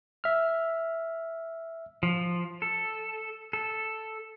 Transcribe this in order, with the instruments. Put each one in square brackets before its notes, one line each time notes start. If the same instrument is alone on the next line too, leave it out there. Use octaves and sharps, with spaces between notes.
[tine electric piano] E5 F6
[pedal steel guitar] F3
A4
A4